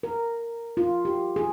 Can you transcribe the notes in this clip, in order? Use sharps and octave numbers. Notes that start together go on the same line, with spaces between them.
A#4
F4
G4
G#4